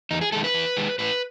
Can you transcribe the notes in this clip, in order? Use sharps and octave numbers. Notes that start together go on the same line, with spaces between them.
E2 D#4
G#4
D#3 G#3 A4
B4
E2
D#3 G#3
A2 B4